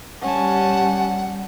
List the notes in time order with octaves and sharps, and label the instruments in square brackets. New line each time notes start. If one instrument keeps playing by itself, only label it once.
[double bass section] G3 [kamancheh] C#4 A5 [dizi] F#5